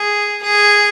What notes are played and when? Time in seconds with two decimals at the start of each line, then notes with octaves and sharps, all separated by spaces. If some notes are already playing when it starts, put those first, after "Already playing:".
Already playing: G#4
0.42 G#4